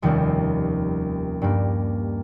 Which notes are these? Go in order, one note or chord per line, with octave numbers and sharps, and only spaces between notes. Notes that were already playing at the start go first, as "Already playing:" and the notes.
F1 D#2 D#3 G3 C#4
G2 G3 A#3